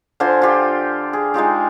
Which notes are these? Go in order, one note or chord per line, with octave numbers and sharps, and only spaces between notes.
D3 F4 C5 G#5
F4 G4
G#4
G#3 D#4 F4 G4